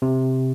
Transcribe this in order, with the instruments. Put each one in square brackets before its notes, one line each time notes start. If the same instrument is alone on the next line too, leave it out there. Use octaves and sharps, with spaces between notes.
[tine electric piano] C3